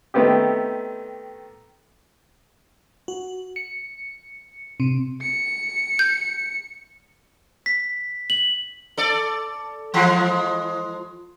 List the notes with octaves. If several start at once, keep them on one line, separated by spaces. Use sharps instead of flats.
D#3 A3 B3 C4 G4
F#4
C#7
C3
C#7
G6
B6
F#7
A4 D5
E3 F3 G#3